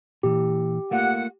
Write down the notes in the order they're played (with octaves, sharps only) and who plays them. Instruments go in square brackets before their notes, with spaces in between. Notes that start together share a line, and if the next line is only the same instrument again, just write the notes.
[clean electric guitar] A#2 E3 [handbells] G4
[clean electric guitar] A3 A#3 F4 [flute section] F#5